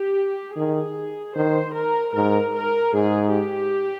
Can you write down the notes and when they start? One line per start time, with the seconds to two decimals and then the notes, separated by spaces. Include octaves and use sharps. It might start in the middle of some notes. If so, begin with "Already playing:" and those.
Already playing: G4
0.56 D#3 G#4
1.35 D#3 C5
1.75 A#4
2.14 G#2 A#4
2.55 A#4
2.94 G#2 G#4
3.32 G4